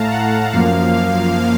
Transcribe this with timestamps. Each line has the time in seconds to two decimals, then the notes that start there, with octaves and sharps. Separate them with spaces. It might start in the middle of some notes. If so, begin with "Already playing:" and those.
Already playing: A2 A3 F5 A5 A#5
0.11 F#5
0.53 F#2 F3 A#3 F5